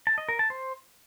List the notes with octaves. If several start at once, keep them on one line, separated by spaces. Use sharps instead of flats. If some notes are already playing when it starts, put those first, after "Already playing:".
A5
D#5
A#4
A5
C5